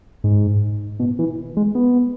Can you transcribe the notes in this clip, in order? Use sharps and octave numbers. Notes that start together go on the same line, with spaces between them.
G#2
B2
E3
G#3
B3